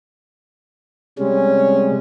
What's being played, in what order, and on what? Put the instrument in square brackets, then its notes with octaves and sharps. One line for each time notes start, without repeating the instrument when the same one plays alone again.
[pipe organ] C3 G3 G#3 [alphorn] C#4